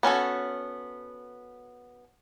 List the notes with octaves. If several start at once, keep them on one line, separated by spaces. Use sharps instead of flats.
B3 C#4 F#4 A4